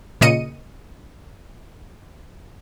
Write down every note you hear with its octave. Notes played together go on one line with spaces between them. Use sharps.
A#2 C#3 D#5 C#7 D#7